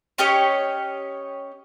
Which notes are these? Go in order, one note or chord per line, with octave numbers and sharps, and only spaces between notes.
C#4 G4 C#5 D#5